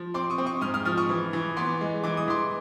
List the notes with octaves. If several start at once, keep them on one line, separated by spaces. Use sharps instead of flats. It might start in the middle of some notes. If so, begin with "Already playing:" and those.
Already playing: F3
C4 C6 D6
C#6 D#6
C4
C#6 D#6
G#2 D#6 F6
D#6 F6
F3 D#6 F6
C#6 D#6
E3
E3
B3 C6 D6
G#3
E3 D6
D#6
E3 C6 D6